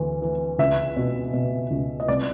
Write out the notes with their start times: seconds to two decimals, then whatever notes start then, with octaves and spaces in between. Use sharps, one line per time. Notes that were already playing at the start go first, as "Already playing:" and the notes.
Already playing: D2 E3
0.22 E3
0.59 C#2 E5
0.97 B2
1.34 B2
1.71 C#2
2.00 D#5
2.08 C2 D5